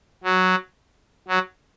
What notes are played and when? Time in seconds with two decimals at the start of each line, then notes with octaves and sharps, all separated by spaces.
0.24 F#3
1.28 F#3